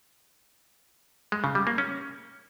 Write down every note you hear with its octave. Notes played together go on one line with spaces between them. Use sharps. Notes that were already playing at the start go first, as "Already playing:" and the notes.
G#3
C#3
G3
A#3
C#4